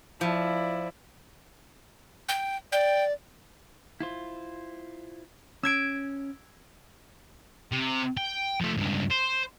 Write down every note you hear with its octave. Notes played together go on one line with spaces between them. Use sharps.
F3 E4 D5
G5
D5 G5
E4 F4 C5
C#4 E6 G#6 D7
C3
G5
F3 A3
C#2 G2
C5